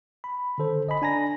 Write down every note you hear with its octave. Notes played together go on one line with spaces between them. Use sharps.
B5
D3 D#3 A4 C5
G1 D#5 G#5 B5
D4 G#5 A#5 A#6